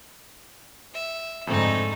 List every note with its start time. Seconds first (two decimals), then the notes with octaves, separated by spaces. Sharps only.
0.94 E5
1.47 F2 G#2 D3 A3 C4 D#4